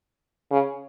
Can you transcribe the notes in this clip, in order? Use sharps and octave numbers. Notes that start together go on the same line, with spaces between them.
C#3